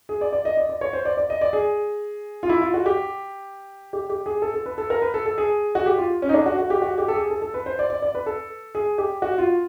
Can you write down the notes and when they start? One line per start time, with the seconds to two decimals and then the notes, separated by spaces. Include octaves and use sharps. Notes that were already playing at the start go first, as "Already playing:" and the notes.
0.09 G#4
0.21 D5
0.33 D5
0.45 D#5
0.57 D5
0.69 D5
0.81 C#5
0.93 C5
1.05 D5
1.17 D5
1.30 D#5
1.41 D5
1.53 G#4
2.43 F4
2.49 E4
2.62 F4
2.74 F#4
2.86 G4
3.93 G4
4.10 G4
4.26 G#4
4.42 A4
4.54 A4
4.66 B4
4.78 A4
4.90 A#4
5.02 B4
5.14 A4
5.26 A4
5.38 G#4
5.75 F#4
5.86 G4
5.98 F4
6.22 C#4
6.29 D#4
6.34 D4
6.46 F#4
6.58 F#4
6.70 G4
6.82 F#4
6.98 G4
7.08 A4
7.14 G#4
7.30 A4
7.42 A4
7.54 B4
7.66 C5
7.79 D5
7.90 D5
8.02 D5
8.15 B4
8.26 A4
8.75 G#4
8.98 G4
9.22 F#4
9.38 F4